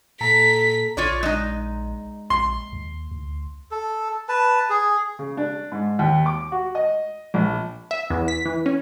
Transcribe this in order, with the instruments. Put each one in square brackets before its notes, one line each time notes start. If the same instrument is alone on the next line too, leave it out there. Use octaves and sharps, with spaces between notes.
[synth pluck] A#2 A4 A#5 [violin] B6
[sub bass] A#1 [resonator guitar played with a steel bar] F4 C#5 D5
[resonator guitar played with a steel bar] G#3 D#4
[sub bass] A#1 [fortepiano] C6
[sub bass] D#2
D2
[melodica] A4
B4 A5
G#4
[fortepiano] C#3
D4
G#2
D#2
D6
F#4
D#5
A#1
[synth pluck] E5
E2
B6
E3
C#4